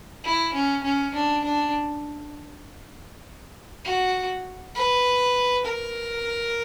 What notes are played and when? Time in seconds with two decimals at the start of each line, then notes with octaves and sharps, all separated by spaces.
0.24 E4
0.54 C#4
0.84 C#4
1.14 D4
1.44 D4
3.85 F#4
4.75 B4
5.65 A#4